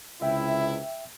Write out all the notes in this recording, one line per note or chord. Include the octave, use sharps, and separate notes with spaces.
C#2 C3 E4 E5 G5